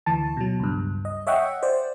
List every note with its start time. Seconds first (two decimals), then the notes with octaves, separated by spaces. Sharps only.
0.06 D2 E3 A5
0.37 B2 F#3
0.60 C#2 G2
1.05 D#5
1.27 C#5 D#5 E5 F#5 G5 C#6
1.63 C5 D5